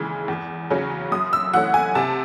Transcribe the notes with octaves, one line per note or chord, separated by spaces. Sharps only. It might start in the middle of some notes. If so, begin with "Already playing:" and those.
Already playing: D#2 C#3 E3 G#3
E2
C#3 F#3 C#4
F#2 D#6
E6
E3 A3 C#4 F#5
G#5
C3 A5